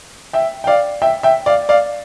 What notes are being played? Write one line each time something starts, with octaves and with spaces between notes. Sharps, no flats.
E5 G5
G5
D5 F5
E5 G5
E5 G5
D5 F5
D5 F5